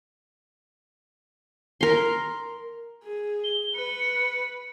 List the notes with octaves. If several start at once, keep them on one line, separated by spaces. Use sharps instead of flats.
A#4 C6
G#4
G7
B4 C#7